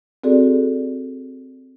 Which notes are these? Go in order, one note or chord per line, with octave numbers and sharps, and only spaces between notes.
C4 F#4 G#4 A4 D5